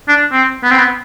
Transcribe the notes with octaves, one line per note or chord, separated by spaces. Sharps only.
D4
C4
B3
C4
B3